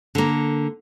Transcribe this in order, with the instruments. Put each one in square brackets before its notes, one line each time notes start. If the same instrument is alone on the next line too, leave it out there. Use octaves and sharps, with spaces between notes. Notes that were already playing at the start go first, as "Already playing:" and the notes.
[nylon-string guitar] D3 A#3